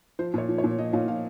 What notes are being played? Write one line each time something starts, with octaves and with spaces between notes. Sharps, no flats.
F3 C5
A#2 C#5
F3
C#5
A#2
F3 D#5
A#2 F5
F3 F5